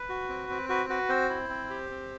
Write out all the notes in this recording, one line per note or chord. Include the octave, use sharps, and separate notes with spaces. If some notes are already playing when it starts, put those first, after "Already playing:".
Already playing: B4
F#4
C4
C4
F#4 B4
F#4 B4
C4 C5
E4
C4
G4
C4